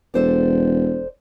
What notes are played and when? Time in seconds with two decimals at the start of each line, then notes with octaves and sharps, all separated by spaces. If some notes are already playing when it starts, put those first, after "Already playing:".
0.14 E1 A4 C5 D5